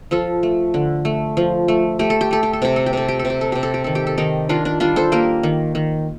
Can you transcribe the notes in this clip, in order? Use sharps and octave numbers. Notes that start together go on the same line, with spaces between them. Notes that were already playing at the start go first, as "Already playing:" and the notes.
F3 F4 A4
A3
D3
A3
F3
A3
A3 G4
A4
G4
A3 A4
G4
A4
C3 G4
A4
G4
C3 A4
G4
A4
C3
G4
A4
C3 G4
A4
G4
D#3 A4
G4
A4
D#3 D#4 G4
D#3 D4 F4
D4
G3 D4 F4
A4 C5
A#3 G4 A#4
D#3
D#3